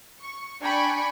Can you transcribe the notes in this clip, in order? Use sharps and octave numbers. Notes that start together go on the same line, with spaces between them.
C#6
D4 G5 G#5 B5 C#6